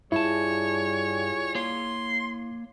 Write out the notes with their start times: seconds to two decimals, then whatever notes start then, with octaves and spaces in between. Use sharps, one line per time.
0.12 G2 G3 E4 F4 G#4 C#5 A5
1.55 A#3 C#5 C6